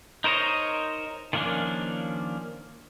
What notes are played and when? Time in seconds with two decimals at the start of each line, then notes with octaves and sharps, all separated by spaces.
0.24 D#4 A#4 C5 C#5 D#5
1.33 D#3 F3 A#3 C#4 D4